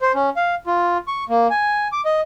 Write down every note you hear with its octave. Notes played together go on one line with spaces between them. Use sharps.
C5
C#4
F5
F4
C#6
A#3
G#5
D6
D#5